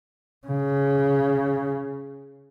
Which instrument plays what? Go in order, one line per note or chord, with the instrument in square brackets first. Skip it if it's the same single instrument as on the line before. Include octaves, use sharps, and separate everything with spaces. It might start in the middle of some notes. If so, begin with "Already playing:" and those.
[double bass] C#3